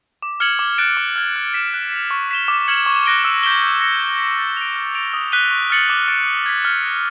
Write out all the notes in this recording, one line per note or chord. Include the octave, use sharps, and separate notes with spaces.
D6
F6 G#6 C#7 F#7
D6
F#6 A6 D7
D6
F6 G#6
F#6
B6 E7
F#6
B6 D7 F7
C#6
F#6 B6 E7 G7
D6
F6 G#6 C#7 F#7
C#6
F#6 A#6 D7 G7
E6
G6 B6 D7 G7
G6
A#6 C#7
G#6
B6 D7
A6
D7 F7
F6
A6 D7 F7
D#6
F#6 B6 D#7 G7
C#6
F6 A6 C#7 F#7
D6
F6 A6 D7
D#6
G#6 B6
F6
A#6 D7